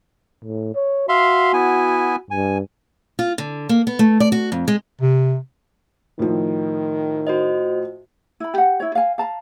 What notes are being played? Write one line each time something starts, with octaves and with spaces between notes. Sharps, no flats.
A2
C#5
F#4 E5 F5 C6
B3 E4 G#5
G2 G#5
F4
D3
A#3
B3
A3
D5
F#4
F2
G#3
C3
A2 D#3 F3
F#4 C5 D#5
E4 B5
G4 F#5
E4 C#5
F5 G#5
F5 A5 A#5